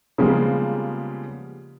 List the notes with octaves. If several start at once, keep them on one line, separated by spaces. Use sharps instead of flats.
C#3 F3 G3 G#3 A#3 B3